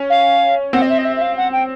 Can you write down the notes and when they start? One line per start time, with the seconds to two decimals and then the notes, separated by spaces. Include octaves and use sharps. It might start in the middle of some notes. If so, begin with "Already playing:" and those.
Already playing: C#4
0.10 F5
0.73 C4 F#5
0.82 D#5
0.89 E5
0.98 D#5
1.05 E5
1.16 E5
1.21 F5
1.37 F#5
1.52 G5